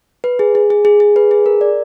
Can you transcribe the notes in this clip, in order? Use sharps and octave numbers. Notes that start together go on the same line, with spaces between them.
B4
G#4
G#4
G#4
G#4
G#4
B4
G#4
A#4
D5